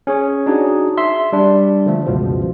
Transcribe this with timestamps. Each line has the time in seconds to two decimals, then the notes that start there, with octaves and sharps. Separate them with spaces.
0.07 C#4 G#4 C#5
0.46 D4 D#4 F#4 G#4
0.98 E5 C6
1.32 G3 D4
1.86 D3 F3 A3
2.06 C#2 F#2 B2 F3